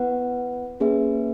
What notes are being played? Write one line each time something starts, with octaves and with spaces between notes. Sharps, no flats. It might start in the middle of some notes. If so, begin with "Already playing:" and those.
Already playing: B3 E4 B4 F#5
A#3 C#4 G#4 B4 E5